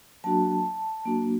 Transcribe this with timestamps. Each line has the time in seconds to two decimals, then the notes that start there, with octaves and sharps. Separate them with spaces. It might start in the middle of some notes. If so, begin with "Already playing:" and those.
0.24 F#3 A#3 D4 F#4 A5
1.05 F#3 A#3 D4 F#4